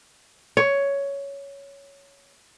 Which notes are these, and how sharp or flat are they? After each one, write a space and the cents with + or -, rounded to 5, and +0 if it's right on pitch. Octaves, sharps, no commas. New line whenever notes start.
C#5 +10